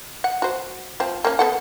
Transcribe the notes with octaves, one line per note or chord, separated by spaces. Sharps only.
F#5
F#4 C5
F3 C4
A#3 C#4
B3 A4 F#5